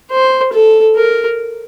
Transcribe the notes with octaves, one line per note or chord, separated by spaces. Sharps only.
C5
A4
A#4